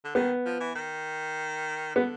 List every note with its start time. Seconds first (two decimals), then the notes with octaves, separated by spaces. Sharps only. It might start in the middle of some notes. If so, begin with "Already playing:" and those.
0.04 D3
0.15 D#3 B3
0.46 F3
0.60 E3
0.75 D#3
1.95 D3 B3